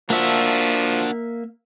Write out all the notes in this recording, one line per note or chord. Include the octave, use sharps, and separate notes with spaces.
F3 A#3 D4 F#4 E5